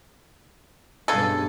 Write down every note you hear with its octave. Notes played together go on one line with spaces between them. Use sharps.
B1 G2 C#3 A4